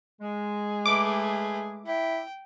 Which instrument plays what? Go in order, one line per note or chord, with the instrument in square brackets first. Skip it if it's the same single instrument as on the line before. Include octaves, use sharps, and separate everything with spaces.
[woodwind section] G#3 [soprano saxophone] G#4
[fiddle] A3 B4 [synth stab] D6
[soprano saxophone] E4 [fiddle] G5